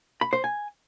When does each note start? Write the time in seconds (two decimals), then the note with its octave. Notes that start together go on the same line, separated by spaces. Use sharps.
0.21 B5
0.33 C5
0.44 G#5